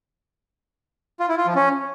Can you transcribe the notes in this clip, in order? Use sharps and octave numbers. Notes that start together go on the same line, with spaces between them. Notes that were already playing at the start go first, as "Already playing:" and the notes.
F4
E4
F4
F3
C#4